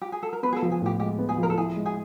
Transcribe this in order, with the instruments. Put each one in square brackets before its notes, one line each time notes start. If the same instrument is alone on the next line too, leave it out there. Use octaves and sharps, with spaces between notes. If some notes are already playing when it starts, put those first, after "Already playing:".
[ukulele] G4
G#4
A4
A#4
[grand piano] B3 [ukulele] B4
[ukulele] G#4
A4
[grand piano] F3
[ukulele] G#4
[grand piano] A2 [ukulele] G4
[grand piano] G#3 [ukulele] G4
[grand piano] B3
[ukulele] G#4
[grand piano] F3
[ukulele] A#4
A4
[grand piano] E4 [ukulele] G#4
[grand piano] G#3
[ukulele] G#4